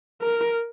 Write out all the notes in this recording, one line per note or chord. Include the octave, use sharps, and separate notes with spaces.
A#4